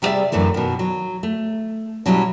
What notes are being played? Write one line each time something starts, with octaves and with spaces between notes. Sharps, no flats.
C3 G3 G4 G#4 D5 E5
F#2 A2 D3 E3 A3
B2 D#3
F#3
A3
B2 F#3 G3 C#4 E4